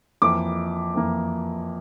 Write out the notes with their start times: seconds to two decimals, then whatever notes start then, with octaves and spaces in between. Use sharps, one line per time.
0.22 F2 E3 A#3 D6
0.94 F2 E3 A#3